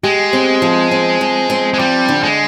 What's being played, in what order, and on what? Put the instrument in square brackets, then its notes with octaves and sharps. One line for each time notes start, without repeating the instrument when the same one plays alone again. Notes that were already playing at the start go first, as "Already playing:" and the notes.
[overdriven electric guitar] G#3 [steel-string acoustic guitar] G4
[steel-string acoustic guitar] C4
F3
C4
F3
C4
[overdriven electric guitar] G#3
[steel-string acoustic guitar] F3 [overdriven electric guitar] G3
[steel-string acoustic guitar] D3
[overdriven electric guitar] G#3